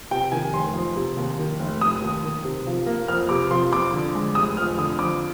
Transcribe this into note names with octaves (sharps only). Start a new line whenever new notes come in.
C3 G5
D#3 G#5
F1 C6
F2
C3
D#2
D#3
F1
F1 D#6
D#2
D#3
C3
F3
A#3
F2 F6
C3 D6
F3 C6
F2 D6
D3
G#3
F1 D#6
F2 F6
D3 D#6
F2 D6